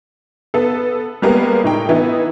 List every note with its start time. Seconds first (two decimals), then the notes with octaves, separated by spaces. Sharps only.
0.54 B3 A4
1.22 G3 G#3 A#3 B3 G4 A#4
1.64 A2 D#4 G5
1.89 E3 B3 D#4 E4